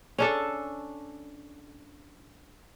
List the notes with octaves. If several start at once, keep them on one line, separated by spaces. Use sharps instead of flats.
C#4 D4 A4